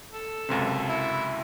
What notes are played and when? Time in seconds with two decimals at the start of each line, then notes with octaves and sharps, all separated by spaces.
0.13 A4
0.49 C#2 F#2 C3
0.88 E4